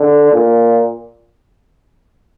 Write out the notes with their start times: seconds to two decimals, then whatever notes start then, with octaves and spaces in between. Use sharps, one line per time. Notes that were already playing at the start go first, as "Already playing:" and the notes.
Already playing: D3
0.33 A#2